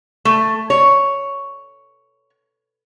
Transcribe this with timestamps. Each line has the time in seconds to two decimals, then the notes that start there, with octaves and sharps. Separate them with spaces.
0.25 A3
0.70 C#5